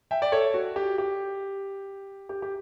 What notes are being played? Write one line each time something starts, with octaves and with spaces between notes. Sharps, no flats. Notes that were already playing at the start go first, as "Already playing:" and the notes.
E5 G5
D5
A4 C#5
F#4
G4
G4
G4
G4